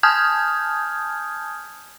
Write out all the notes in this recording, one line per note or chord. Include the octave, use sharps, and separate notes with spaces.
G#5 A5 D#6 F6 G6 G#6